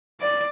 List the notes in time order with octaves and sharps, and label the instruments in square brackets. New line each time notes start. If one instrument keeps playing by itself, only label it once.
[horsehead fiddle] D5